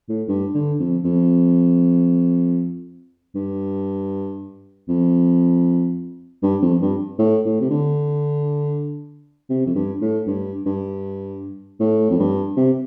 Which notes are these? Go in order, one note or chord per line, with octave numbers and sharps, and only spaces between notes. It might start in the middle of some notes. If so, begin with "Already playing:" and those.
A2
G2
D3
F2
F2
G2
F2
G2
F2
G2
A2
A2
C3
D3
C3
F2
G2
A2
G2
G2
A2
F2
G2
C3